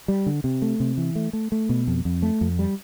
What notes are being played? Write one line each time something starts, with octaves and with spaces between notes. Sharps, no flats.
G3
D3
C3
A3
C3
E3
A3
A3
A3
B2
F2
F2
A3
F2
G3